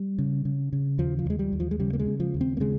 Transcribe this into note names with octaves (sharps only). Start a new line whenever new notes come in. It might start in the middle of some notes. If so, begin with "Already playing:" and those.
Already playing: G3
C#3
C#3
C#3
D#2 F3
F3
D#2 G#3
G3
D#2
F3
G#3
C#3 G3
A#3
G#3
C#3
F3
D#2
C4
A#3
C#3 G#3